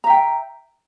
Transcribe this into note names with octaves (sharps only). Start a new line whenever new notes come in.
E5 G5 A#5